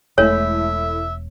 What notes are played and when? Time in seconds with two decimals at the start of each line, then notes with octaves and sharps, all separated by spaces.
0.18 E1 G#3 A3 E4 C#5 E5